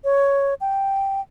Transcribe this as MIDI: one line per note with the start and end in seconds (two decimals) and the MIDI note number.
0.04 0.54 73
0.61 1.21 79